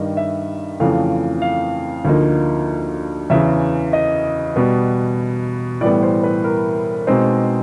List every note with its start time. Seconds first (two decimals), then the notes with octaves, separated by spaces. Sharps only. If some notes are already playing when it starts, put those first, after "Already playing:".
Already playing: G2 D#3 G3 D#5
0.17 E5
0.80 F2 C#3 E3 A3 F5
1.42 F5
2.05 D2 D3 F3 A#3 D#4
3.30 E2 C#3 E3 E5
3.93 D#5
4.56 B2 G3 B3
5.81 A2 E3 G3 B3 D5
6.03 C5
6.24 B4
6.44 A#4
7.07 B2 G#3 C4 D#4 C5